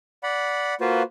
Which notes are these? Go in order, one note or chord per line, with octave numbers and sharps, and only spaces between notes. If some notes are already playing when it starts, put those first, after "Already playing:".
D5 F#5 B5
A#3 F4 F#4 B4 C5